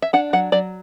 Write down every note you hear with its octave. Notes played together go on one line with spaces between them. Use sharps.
E5
D4 F#5
F#3 F#5
F#3 D5